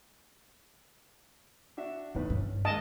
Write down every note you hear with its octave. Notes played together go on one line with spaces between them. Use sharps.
D4 F#4 E5
A2 D#3 B3 B4
G2 C#4
G#3 A#3 D#5 A5